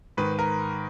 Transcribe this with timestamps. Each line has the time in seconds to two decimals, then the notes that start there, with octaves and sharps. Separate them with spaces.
0.17 G#2 D#3 B4
0.39 A#4